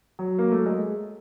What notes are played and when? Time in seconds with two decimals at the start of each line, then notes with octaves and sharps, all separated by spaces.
0.19 F#3
0.38 A#3
0.52 A3
0.66 G#3